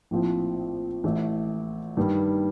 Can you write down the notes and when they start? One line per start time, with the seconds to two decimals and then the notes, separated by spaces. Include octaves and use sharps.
0.11 A#1 A2 F3 C4
1.04 A1 A2 A3
1.97 G2 D#3 G3